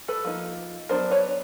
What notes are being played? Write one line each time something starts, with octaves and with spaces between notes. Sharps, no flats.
A4 B4
F3 A#3 D#4
F#3 B3 D4 A#4 C5
B4 C#5